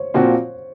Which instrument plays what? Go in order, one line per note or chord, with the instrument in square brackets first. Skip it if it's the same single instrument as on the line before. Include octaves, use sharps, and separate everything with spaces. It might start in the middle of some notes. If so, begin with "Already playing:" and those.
Already playing: [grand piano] C5 C#5
[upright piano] A#2 F3 C4 F#4